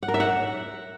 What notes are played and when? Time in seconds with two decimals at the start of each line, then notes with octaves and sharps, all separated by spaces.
0.03 F#5
0.08 A#4
0.14 E5
0.20 F#5